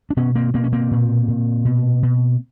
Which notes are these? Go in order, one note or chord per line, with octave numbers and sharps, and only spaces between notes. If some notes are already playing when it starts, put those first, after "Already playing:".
D4
B2 B3 C#4
A#3 C4
B2 A#3 C4
C#4
A#3 C4
A#2
A#2
B2
B2